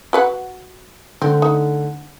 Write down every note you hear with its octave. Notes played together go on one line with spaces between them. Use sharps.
F#4 B4 F#5
D3 A3 C4
D#4